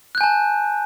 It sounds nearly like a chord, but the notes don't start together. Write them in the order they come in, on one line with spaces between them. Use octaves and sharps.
F#6 G6 G#5 A5